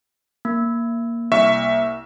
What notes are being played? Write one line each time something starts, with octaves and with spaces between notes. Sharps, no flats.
A#3
C2 E5 C#6